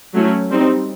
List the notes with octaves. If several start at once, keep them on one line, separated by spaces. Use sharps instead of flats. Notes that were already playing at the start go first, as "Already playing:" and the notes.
F#3 A3 C#4 E4
G3 C4 D#4